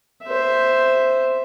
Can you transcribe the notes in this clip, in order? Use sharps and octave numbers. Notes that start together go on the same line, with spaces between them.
C5 E5